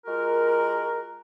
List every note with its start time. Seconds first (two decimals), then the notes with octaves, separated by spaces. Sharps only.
0.06 G#3 F4 F#4 A#4